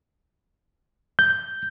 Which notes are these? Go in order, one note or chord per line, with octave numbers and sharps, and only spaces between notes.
G6